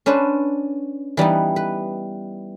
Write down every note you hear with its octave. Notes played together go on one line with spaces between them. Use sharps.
C#4 D4 B4 C5
E3 G3 B3 D#4
B4